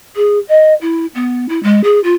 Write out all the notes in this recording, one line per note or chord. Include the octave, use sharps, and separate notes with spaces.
G#4
D#5
E4
B3
E4
G#3
G#4
F4